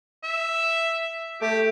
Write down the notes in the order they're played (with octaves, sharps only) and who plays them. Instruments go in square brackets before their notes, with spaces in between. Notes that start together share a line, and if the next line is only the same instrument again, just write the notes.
[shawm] E5
[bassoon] A3 [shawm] G4